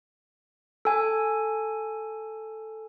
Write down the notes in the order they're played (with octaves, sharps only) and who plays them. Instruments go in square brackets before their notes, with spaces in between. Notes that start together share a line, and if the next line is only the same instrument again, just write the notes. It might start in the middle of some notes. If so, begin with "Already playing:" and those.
[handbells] A4 G#5